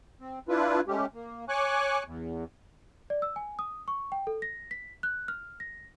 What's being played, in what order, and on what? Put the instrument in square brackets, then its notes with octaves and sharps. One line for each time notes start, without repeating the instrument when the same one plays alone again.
[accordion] C4
D4 E4 F4 B4
G#3 A3 C#4 G4
A#3
C#5 G#5 C#6 D6 F#6
E2
[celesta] D5
E6
G#5
D#6
C#6
G5
A4
A#6
B6
F#6
F6
A#6